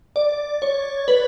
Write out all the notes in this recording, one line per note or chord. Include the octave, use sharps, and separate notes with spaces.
D5
C#5
B4